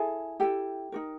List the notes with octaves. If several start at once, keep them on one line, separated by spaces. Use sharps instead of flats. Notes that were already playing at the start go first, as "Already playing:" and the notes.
Already playing: E4 G#4 A4 G#5
E4 G4 A4 G5
D#4 F#4 A#4